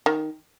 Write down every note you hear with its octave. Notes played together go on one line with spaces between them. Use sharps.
D#3